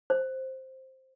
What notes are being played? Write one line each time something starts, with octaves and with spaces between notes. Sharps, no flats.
C5